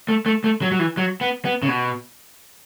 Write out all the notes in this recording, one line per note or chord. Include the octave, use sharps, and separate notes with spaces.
A3
A3
A3
F#3
F#3
E3
F#3
B3
B3
C#3
B2